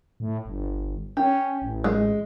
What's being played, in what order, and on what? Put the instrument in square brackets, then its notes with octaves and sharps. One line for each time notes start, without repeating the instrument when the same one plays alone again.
[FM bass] A2
G1
[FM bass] C#4 [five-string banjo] G4
[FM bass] A1
[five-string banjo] G#3